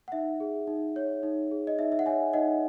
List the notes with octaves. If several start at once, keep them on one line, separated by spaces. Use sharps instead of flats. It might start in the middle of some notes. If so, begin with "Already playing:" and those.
F#5
D#4 E5
G#4
D#4
C#5
D#4
G#4
D#5
D#4 E5
E5
F#5
C#5 E5 G#5
D#4 D#5 F#5